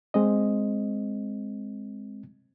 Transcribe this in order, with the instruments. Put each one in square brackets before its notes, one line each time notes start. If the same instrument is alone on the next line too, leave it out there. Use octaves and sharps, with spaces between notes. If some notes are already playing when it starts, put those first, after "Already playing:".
[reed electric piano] G#3 C4 D#5